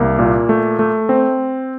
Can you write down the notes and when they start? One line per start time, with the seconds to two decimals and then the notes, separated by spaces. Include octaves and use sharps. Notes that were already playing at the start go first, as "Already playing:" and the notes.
Already playing: C2 A#3
0.19 A#2
0.49 A3
0.79 A3
1.09 C4